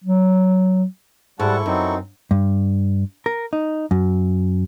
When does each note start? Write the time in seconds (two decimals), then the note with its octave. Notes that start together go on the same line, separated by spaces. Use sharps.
0.04 F#3
1.39 G#2 G3 E4 A4 F#5 A5 C#6
1.66 F#2 F#3 C4 D#4
2.31 G2
3.26 A#4
3.53 D#4
3.91 F#2